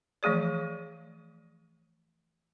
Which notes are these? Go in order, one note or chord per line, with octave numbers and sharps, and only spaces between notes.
E3 F3 A3 G#4 D5